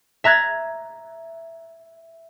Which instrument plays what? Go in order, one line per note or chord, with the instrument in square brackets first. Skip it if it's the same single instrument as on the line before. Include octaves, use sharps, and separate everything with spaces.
[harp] E5 A#5 F#6 G#6 A6